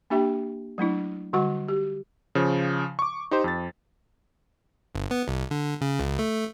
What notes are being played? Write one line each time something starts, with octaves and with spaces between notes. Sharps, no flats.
A#3 D4 G4 E5 G5
F#3 A3 D4 E4
D3 G3 F#4 F#5 C#6
G4
C#3 F3
C#6 D6
D#4 G4 C5
F2 A6
G1
B3
C2
D3
C#3
C#2
A3